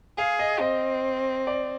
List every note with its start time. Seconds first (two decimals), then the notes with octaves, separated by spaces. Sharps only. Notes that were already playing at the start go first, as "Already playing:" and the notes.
0.18 G#4 F5
0.39 D#5
0.60 C4 D#5
1.47 D5